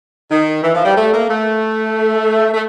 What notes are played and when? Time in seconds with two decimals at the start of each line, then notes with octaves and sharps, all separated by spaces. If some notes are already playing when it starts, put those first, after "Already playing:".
0.30 D#3
0.62 E3
0.74 F3
0.85 G3
0.95 A3
1.12 A#3
1.29 A3
2.54 A3